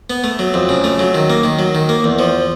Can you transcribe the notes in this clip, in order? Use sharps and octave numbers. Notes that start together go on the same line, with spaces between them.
B3
A3
F#3
F2
C#3
A3
F#3
D#3
A#3
D#3
F#3
D#3
A#3
E2
F3